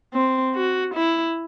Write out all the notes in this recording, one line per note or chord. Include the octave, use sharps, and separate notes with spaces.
C4
F#4
E4